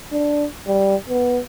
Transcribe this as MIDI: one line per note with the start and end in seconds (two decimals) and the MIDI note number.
0.12 0.46 62
0.68 0.96 55
1.09 1.39 59